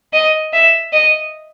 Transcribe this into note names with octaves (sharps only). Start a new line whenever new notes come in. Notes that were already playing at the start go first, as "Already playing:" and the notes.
D#5
E5
D#5